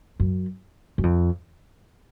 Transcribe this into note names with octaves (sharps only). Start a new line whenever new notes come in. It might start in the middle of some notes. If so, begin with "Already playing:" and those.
F#2
F#2
F2